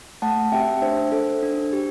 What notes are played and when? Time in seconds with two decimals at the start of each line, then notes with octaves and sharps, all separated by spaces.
0.22 A3 F#5 A5
0.52 C4 G4 E5 G5
0.82 D4 C5 E5
1.12 A4
1.42 D4
1.73 G4